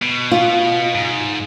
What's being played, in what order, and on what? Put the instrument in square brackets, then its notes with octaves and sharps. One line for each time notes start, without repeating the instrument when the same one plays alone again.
[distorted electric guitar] B2
[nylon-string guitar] F4
[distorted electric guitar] G#2